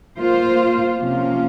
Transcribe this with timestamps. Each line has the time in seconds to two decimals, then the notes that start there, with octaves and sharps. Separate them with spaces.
0.18 A#3 F4 C5
0.99 C3 F3 A#3 C#4 F4